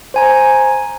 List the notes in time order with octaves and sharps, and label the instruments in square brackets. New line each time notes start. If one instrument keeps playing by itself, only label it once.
[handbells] C5 G#5 A#5